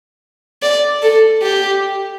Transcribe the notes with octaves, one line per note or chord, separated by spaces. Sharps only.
D5
A4
G4